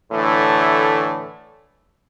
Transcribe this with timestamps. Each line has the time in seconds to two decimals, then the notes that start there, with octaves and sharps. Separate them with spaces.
0.12 A2 D3 E3 A3